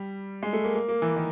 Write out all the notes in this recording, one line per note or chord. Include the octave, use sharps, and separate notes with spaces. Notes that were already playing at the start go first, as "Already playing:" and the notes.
Already playing: G3
G#3
A3
A#3
A#3
A#3
E3
D#3